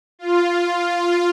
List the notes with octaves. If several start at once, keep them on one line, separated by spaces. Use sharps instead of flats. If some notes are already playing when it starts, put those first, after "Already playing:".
F4